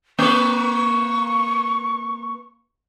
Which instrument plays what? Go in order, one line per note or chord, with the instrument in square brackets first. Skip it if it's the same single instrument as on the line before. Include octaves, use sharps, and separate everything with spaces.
[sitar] A#3 B4 [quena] C#6